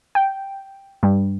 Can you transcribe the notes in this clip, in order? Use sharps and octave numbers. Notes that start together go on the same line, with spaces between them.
G5
G2 G3